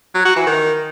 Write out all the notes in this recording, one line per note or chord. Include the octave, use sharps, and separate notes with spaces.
F#3
F#4
E3
D#3